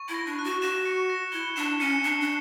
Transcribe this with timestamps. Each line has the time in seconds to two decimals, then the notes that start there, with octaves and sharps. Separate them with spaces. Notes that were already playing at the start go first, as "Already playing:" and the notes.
Already playing: C#6
0.09 E4
0.14 A#6
0.26 D4
0.39 F#6
0.44 F#4
0.62 F#4 E7
0.85 C#7
1.10 A#6
1.32 E4 G7
1.56 D4 E7
1.80 C#4 C#7
2.03 D4 C#7
2.21 D4